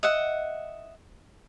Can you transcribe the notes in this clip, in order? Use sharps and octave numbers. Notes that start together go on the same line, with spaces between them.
D#5 E5 F#5